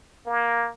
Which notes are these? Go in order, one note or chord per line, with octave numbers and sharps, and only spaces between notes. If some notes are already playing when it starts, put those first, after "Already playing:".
A#3